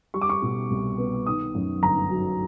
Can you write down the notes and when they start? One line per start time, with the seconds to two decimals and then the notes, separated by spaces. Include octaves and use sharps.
0.14 G3 C#6
0.21 D6
0.29 C#6
0.42 B2
0.70 C2
0.98 B3
1.26 D#3 D#6
1.55 F#2
1.83 G1 A#5
2.10 F#3